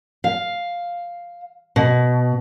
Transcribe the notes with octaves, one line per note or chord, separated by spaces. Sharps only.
F5
B2